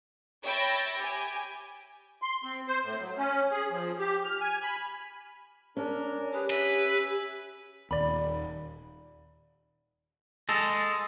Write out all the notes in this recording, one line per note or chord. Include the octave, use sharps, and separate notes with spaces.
C#5 E5 G5 B5 A6 A#6
G4 G#5
C6
C4
C5
A2
F#3
C#4
G#4
F3
G4
F6
G#5
B5
C#4 D4 A#4
G4 G#4 B4
B4 E5 G#5
D#1 D#2 D5 B5
G#3 A4